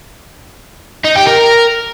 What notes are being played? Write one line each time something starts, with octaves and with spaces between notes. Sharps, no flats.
D#4
G4
A#4